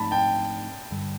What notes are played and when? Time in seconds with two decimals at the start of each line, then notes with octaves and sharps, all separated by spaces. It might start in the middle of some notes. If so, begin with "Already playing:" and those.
Already playing: G#2 F3 A3 C4 D#4 A5 B5
0.11 G5 A5
0.91 G2 D3 G3